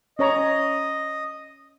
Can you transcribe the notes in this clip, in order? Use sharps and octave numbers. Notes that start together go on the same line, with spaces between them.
C#4 C#5 D#5 A#5